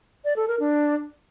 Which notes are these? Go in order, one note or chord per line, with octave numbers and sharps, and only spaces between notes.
D5
A4
A#4
D4